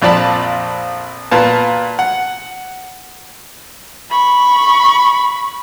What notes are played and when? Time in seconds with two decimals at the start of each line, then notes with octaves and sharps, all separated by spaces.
0.02 A#1 F2 F4 D5 A5 B5
1.31 A#2 B3 A5
1.99 F#5
4.10 B5 C#6